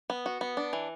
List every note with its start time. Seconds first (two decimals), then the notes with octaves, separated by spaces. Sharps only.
0.10 B3
0.26 F#4
0.41 B3
0.57 D4
0.73 E3